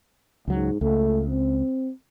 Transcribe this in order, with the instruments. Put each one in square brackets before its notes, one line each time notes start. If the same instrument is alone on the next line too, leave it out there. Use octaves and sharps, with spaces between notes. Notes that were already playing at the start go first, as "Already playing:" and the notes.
[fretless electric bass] C#2 F#3 [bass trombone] G#2
[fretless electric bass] C#2 [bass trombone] A3
[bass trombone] C4